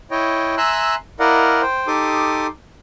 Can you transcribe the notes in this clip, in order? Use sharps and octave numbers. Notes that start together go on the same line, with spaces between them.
E4 C#5 D#5 G5
E5 G#5 A#5 C6 E6 F#6
E4 A#4 D5 D#5 F5 F#5
C5 G5
D#4 G4 A4 C6 D6 D#6